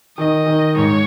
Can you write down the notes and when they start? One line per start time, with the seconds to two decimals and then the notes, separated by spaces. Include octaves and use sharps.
0.18 D#3 D#5
0.46 D#3
0.76 G#2 C#5